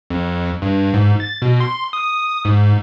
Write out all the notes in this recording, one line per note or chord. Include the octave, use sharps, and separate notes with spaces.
F2
G2
G#2
A6
B2
C6
D#6
G#2